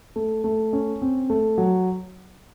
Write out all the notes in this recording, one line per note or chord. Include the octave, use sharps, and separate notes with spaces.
A3
A3
C#4
C4
A3
F#3